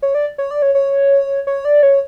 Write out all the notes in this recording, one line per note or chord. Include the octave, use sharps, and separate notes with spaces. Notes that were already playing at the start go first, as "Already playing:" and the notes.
C#5
D5
C#5
D5
C#5
C#5
C#5
D5
C#5